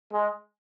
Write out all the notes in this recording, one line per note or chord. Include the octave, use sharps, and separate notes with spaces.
G#3